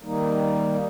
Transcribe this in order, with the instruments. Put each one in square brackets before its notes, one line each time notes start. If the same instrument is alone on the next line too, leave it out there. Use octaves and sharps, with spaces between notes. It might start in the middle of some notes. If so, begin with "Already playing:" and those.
[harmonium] D#3 G3 A#3 D#4